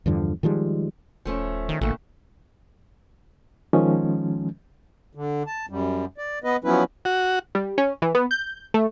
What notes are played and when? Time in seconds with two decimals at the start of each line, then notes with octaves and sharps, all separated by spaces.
0.06 E2 G2 D3 F3
0.43 D#3 F3 G3 G#3
1.25 D#1 F3 A3 C#4
1.69 D#3
1.81 A1 A#2 D3 A3
3.73 D#3 F3 G#3 C#4
5.15 D3
5.47 A5
5.70 F#2 G3
6.18 D5
6.44 B3 B4 D#5
6.64 F3 F#3 B3 C#4 E4 B4
7.05 F#4
7.55 G3
7.78 C#4
8.02 E3
8.15 B3
8.31 G6
8.74 A3